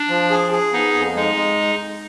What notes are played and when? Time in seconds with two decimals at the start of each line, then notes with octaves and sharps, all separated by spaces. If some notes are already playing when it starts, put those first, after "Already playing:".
Already playing: D4
0.09 F3
0.30 G#4
0.52 G#4
0.73 B3 D#4
0.95 F2
1.16 G#3 D#4
1.36 G#3